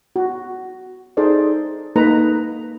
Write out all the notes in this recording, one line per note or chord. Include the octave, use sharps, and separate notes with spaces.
F#4
D#4 G#4 A4 C5 D5
A#3 D#4 A4 B4 A#5